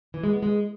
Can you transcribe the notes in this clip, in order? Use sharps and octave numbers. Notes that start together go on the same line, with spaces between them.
E3
G#3
B3
G#3